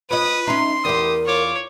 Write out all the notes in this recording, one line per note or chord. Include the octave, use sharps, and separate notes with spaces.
F4 B4 C#5 D#5 D#6
C#4 D#4 E5 C6
E2 E4 G4 A#4 D#6
F4 C#5 D6